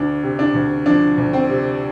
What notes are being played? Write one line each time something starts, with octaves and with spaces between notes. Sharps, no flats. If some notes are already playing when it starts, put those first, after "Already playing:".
Already playing: D2 D4
C3
D4
D2
F3 D4
D2
C4
C3